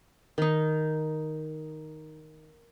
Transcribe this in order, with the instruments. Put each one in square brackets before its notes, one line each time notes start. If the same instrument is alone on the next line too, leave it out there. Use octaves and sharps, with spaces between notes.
[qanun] D#3 D#4